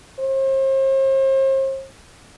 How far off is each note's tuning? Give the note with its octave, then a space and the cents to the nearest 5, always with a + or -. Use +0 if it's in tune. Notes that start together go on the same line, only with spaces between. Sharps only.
C5 +40